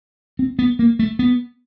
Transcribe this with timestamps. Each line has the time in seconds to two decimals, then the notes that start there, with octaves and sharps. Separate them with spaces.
0.39 C4
0.59 B3
0.79 A#3
0.99 A3
1.19 B3